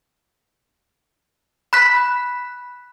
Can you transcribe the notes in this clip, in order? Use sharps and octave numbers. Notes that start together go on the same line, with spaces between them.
B5 F#6 B6